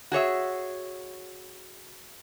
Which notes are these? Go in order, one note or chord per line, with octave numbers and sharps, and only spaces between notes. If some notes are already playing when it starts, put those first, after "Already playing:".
F#4 G#4 C#5 E5